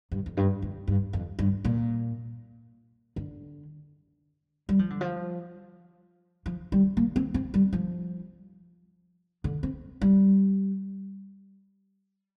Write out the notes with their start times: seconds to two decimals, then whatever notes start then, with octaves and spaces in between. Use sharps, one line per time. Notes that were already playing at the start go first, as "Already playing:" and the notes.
0.11 G2
0.26 F2
0.37 G2
0.62 F2
0.88 G2
1.13 F2
1.39 G2
1.65 A#2
3.16 D3
4.69 G3
4.79 F3
4.90 D3
5.01 F3
6.46 F3
6.72 G3
6.97 A#3
7.16 C4
7.34 C4
7.54 G3
7.73 F3
9.44 D3
9.63 C4
10.01 G3